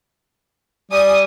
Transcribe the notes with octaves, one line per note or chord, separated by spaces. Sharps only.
G3 G#5 D#6